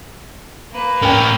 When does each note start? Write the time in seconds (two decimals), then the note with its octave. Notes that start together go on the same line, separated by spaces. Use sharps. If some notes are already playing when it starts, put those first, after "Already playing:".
0.72 A#3 B4
1.02 A2 C#4 A#4 G5